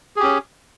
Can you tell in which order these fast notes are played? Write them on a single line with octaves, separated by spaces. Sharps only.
G#4 G4 C#4